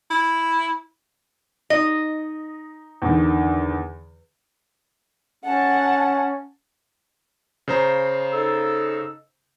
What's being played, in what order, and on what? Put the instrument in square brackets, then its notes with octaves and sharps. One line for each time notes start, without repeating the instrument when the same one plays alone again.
[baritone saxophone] E4
[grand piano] D#4 [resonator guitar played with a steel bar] D#5
[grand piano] E2 D3 D#3
[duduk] C#4 [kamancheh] F#5 A5
[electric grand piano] C#3 C5 A#5
[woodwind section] D#4 A4 E6